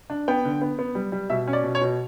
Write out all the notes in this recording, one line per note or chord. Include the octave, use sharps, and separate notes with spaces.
D4
B3 G5
D3
B3
B3
G3
G3
B2 E5
C#4
D5
B2
C#5
B2